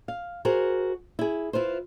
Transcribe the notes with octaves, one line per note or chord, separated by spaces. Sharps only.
F5
F#4 G#4 A#4 C5
E4 G#4
E4 F4 B4 C5